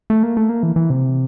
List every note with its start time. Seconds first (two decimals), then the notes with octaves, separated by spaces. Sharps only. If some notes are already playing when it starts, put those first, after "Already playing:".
0.10 A3
0.23 A#3
0.37 A3
0.49 A#3
0.63 E3
0.76 E3
0.90 C3